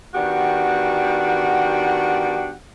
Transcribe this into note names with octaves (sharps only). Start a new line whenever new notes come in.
D#3 B3 D4 F#4 G4 F#5